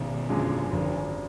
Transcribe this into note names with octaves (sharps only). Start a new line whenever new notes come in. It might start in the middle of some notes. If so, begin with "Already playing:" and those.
Already playing: G#1 B2 D#3
F#2 D3 F3 G#3
G#1 D3 F3